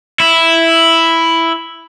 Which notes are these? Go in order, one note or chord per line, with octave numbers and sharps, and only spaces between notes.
E4